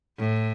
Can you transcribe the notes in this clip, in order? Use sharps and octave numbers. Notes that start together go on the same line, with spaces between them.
A2